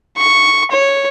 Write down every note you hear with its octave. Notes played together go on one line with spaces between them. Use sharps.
C#6
C#5